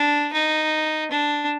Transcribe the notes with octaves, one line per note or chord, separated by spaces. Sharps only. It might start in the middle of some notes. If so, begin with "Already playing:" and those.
Already playing: D4
D#4
D4